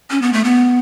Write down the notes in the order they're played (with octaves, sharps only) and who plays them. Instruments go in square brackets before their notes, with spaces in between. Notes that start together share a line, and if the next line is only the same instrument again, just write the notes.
[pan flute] C#4
B3
A3
B3